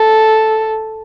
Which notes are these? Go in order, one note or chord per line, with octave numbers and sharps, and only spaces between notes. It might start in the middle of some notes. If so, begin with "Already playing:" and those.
Already playing: A4